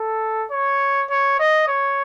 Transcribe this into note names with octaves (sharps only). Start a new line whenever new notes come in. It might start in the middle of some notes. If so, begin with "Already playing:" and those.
Already playing: A4
C#5
C#5
D#5
C#5